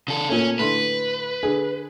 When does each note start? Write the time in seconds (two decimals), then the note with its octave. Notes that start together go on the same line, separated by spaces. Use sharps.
0.08 C#3 A4
0.30 A#2 A3 C#4
0.59 A2 D3 B4 C6
1.43 D3 G#4